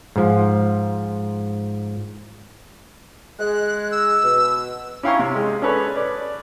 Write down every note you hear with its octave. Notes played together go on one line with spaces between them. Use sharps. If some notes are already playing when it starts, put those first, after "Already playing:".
G#2 F3
G#3 F#6
E6
B2
C#4 E4 F5 G5 A#5 C#6
C3
G#3
C#4 G#4 A4 B4 C#5 D5
B4 D5